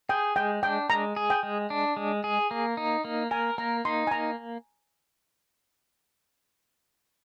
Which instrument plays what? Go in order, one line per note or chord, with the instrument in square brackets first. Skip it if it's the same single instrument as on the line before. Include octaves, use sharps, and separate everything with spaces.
[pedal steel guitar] G#4 [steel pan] G5
[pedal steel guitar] G#3 [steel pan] G5
[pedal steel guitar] D4 [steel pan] G5
[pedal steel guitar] G#3 [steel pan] A#5
[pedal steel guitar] G#4
[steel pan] G5
[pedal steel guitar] G#3
D4
G#3
G#4
A#3
D#4
A#3
[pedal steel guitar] A#4 [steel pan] G#5
[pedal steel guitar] A#3 [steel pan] A#5
[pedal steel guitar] D#4 [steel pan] C6
[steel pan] G#5
[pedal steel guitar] A#3 [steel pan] A#5